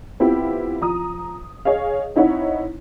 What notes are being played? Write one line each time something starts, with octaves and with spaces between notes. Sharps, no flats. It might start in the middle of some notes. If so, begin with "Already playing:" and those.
B3 C4 E4 F4 G4
F3 A#5 D#6
G#4 C#5 D#5 F5
C4 D#4 E4 C#5 F#5